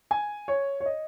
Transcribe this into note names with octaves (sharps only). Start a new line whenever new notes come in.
G#5
C#5
C#5
D#5